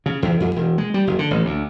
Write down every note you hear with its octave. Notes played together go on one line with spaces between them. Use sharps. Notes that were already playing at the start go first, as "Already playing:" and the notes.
C#3
E2
F2
E1
G#3
G3
F#1
D3
A1
D2